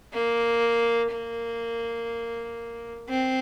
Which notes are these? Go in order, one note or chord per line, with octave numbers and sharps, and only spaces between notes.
A#3
A#3
C4